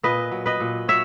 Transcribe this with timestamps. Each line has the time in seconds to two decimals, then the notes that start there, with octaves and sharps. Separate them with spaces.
0.03 A#2 B4 D#5
0.32 F#3
0.46 B4 D#5
0.60 A#2
0.88 F#3 C#5 E5